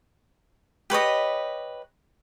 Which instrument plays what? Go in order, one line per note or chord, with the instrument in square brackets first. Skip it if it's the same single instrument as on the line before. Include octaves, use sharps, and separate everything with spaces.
[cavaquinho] G4 B4 C#5 D#5